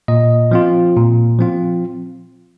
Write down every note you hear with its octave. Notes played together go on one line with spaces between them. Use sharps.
A#2 D#5
F3 C4 F4
A#2
F3 C4 F4